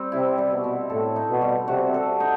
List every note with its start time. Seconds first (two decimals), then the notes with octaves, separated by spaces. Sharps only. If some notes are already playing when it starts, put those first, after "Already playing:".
Already playing: G3 C4
0.12 C3 E4
0.38 G3
0.51 B2
0.64 C4
0.90 A2 A4
1.16 D#4
1.29 B2
1.42 G3
1.68 C3 F#4
1.94 A4
2.20 D#4